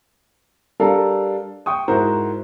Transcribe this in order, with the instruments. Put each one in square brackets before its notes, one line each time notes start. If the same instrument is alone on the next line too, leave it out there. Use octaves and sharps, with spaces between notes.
[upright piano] G3 D4 A4 A#4 F5
G5 C#6 D#6
G#2 E4 F#4 A#4 C5